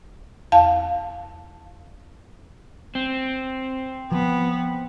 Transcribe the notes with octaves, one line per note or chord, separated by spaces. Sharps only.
E2 F5 A5
C4
F3 B3